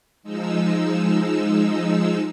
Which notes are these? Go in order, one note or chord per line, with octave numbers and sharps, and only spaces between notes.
F3 G#3 D#4 E6